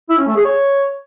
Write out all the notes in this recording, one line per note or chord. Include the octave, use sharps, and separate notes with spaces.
E4
C#4
A3
G#4
C#5